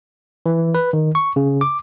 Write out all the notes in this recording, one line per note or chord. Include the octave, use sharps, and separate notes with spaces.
E3
B4
D#3
C#6
C#3
D6